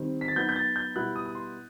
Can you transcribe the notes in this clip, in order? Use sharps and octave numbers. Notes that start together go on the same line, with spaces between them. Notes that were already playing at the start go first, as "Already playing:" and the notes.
Already playing: D#3 G3 C4
B6
A6
F#3 B3 D#4 G6
G6
A6
G6
B2 G3 B3 E4 F#6
D#6
D#6
C6